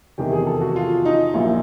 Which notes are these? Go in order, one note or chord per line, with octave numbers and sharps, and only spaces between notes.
F1 E2 C3 D#3 G4
G#4
A4
F#4
F4
D#4
A#1 A#2 F#3 E4